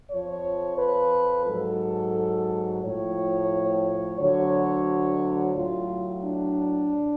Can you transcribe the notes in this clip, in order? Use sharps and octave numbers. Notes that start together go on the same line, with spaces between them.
F2 F3 C#5
B4
G#2 F#3 A4
A2 F3 C#5
D2 D3 F#3 C#5
A2 F#3 F4
D4